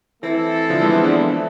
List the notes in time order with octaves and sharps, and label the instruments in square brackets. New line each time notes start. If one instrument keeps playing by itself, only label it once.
[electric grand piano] E3 [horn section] A3 C4 E4 A4
[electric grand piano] D3 F3
E3 G#3
G#3 B3
B3 D4
[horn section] A3 E4 A4